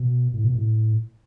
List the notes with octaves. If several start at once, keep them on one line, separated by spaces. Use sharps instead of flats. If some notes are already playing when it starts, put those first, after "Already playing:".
Already playing: B2
A2
B2
A2